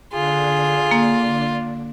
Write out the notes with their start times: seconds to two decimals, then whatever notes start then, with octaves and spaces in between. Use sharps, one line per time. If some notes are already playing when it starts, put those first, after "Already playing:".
0.13 D3 D4 F4 G#4
0.91 A#3